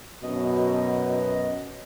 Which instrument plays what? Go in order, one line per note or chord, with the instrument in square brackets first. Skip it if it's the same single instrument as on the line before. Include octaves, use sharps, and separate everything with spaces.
[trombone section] F#2 B2 [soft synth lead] D#5